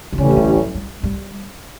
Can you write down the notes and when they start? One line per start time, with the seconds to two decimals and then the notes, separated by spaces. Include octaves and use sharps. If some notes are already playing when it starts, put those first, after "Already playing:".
0.13 B2
0.18 A1 A2 C#3 G3 C#4
0.31 C#3
0.36 D3
0.56 F#3
0.75 G3
1.03 G3